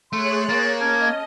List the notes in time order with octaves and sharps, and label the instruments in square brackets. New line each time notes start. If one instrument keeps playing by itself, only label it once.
[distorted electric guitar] A3 [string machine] G#4 C#5 F#6 [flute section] C6
[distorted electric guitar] A#3 [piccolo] A6
[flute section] C#4 A5 F6 [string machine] D#5 [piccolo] G#6